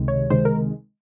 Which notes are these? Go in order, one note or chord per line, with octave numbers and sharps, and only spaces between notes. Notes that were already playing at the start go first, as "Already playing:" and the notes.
Already playing: C#2 C3 D#3 G#3
C#5
C#2 C3 D#3 G#3 C5
A#4